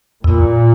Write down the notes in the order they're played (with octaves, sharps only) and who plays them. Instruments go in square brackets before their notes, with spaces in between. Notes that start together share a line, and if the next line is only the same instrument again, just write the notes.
[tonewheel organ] E2 [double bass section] A#2